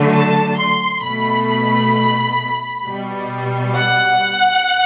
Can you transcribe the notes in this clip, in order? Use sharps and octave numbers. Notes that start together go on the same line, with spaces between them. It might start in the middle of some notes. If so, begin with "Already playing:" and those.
Already playing: D3 F#3 A3
A5
C6
B2 A3 B5
B2 G3
F#5